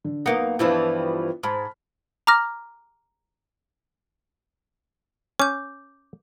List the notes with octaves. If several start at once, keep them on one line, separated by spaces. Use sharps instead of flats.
D3
F#2 A#3 B3 D#4 F#5 C#7
G2 E3 F3 B3 D4 E4
G#2 A5 B5 F6
A#5 D6 F6 A#6
C#4 D6 G6